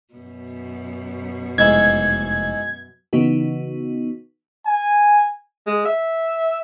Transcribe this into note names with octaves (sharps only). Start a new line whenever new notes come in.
F#2 B2
F1 G#2 G#3 E4 G#6
C#3 E3 B3 D#4 F#4
G#5
G#3
E5